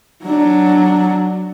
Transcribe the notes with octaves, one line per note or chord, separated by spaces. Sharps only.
F#3 D4